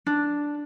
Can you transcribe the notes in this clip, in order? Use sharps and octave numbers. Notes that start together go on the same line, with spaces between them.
D4